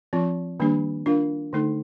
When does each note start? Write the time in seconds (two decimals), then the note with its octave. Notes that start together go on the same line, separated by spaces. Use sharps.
0.13 F3 C4 F4
0.60 D#3 G3 A#3 D4 G4
1.06 D4 F4 A#4 F5
1.53 D3 A3 D#4 A4